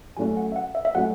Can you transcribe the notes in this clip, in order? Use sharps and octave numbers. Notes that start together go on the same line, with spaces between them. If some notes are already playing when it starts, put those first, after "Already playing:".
F#3 A3 C#4 F#4 G#5
F#5
E5
F#5
E5
E5
F#3 A3 C#4 F#4 F#5